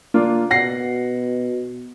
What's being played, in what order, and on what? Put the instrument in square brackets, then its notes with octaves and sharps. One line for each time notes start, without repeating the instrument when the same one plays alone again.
[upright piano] A#3 D4 F4
[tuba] B2 [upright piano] F#5 A#6 C7